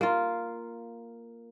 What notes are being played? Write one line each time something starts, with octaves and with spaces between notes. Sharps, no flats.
A#3 F4